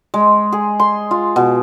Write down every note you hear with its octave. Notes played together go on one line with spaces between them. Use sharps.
G#3
G#4
C6
F4
B2